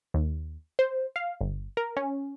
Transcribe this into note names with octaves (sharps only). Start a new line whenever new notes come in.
D#2
C5
F5
G1
A#4
C#4